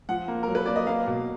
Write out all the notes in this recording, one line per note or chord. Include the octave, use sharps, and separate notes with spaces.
F3 F#5
A#3
F#3 A#4
B4
A#3 D5
D#5
A#3 F5
B2